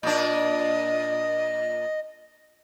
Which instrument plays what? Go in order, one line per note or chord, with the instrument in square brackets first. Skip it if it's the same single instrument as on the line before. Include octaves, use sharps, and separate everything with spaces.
[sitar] A#2 D4 [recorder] D#5